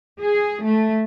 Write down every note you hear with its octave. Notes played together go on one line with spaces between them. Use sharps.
G#4
A3